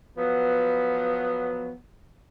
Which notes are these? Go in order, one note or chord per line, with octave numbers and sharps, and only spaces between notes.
F3 F#3 B3